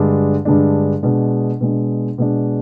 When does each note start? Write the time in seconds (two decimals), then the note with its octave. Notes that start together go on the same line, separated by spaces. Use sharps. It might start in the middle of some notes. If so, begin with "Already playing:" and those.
Already playing: G2 D3 G#3 D4
0.45 G2 D3 G#3 D4
1.03 B2 G#3 D4
1.61 B2 G#3 D4
2.18 B2 G#3 D4